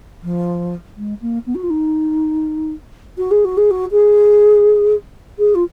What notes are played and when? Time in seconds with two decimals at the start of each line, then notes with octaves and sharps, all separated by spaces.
0.23 F3
0.97 G#3
1.21 A#3
1.46 B3
1.55 F#4
1.63 F4
1.70 D#4
3.18 F#4
3.31 G#4
3.45 F#4
3.57 G#4
3.70 F#4
3.92 G#4
5.39 G#4
5.55 F4